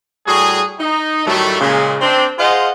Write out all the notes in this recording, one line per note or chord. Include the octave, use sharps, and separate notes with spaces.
A2 G3 F#4 G#4
D#4
A2 D#3 F#3 G3 A3
A#2 C#3 G#3
C4 D4
F4 G#4 C5 D#5 F5 F#5